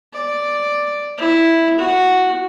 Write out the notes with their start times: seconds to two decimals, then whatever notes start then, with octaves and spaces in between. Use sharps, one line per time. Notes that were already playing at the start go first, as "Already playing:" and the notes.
0.13 D5
1.18 E4
1.79 F#4